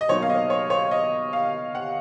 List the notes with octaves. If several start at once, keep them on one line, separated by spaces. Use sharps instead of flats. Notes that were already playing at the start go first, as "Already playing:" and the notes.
D#5
B2 F#3 A#3 D#4 C#5
F5
D#5
C#5
C#5
D#5
F5
F#5